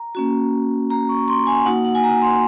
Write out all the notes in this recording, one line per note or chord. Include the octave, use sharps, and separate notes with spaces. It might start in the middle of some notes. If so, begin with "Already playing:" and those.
Already playing: A#5
A#3 C#4 F#4
A#5
C#6
C6
G#5
A#3 D#4 F#4 F#5
F#5
G#5
A#5
C6